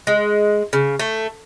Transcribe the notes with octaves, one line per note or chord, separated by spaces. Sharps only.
G#3
C#3
A3